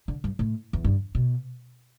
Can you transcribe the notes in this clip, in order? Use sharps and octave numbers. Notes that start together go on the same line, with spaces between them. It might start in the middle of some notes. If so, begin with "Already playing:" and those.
D3
G2
A2
E2
G2
B2